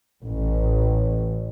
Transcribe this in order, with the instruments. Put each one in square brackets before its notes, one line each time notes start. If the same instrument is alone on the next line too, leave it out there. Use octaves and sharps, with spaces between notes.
[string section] A1